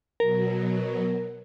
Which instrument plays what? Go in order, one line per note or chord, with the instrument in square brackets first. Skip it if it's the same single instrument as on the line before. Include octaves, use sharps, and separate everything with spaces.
[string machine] B2 F#3 [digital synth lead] A#4